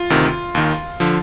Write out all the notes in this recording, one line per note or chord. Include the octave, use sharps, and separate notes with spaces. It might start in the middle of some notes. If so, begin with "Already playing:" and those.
Already playing: F4
D2 C3 D#3
D#2 D#3
D3 F3